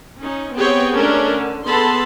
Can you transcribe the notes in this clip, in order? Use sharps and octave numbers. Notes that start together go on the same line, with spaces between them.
C#4 D#4
B3 C4 G4 G#4 C#5 G5
G#3 A3 C#4 D4 A4 A#4
D3
B3 G#4 A4 A5 B5 C6